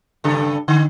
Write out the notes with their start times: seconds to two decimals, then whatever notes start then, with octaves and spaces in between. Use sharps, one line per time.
0.24 G2 C#3 A4
0.68 D3